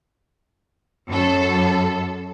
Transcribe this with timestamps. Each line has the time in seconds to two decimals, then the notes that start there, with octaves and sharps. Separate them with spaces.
1.07 F#2 A4